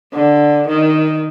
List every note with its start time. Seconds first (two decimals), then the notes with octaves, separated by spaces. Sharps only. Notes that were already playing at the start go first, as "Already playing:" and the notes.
0.14 D3
0.68 D#3